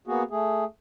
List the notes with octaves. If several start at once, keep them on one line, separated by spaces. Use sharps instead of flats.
A#3 B3 F#4 G#4
A3 G#4